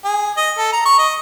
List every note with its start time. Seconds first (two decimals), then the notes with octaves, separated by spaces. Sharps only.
0.04 G#4
0.37 D#5
0.58 A4
0.73 A#5
0.85 C#6
0.99 D#5